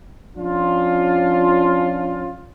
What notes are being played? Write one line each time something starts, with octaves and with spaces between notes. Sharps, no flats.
F3 C#4 D4 F4